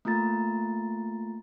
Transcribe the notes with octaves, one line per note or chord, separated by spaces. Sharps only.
A3 A#3 F4 A#5 A6